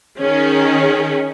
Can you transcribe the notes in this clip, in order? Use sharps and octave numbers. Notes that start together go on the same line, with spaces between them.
D#3 C#4 G#4